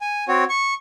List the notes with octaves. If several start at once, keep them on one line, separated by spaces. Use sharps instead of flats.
G#5
C4 F#4 C#5
C#6